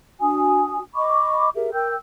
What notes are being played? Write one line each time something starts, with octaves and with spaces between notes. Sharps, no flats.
D4 F#4 G#5 D#6
D#5 B5 C#6 D6
G4 G#4 A#4 E5
A#4 G5 E6 G6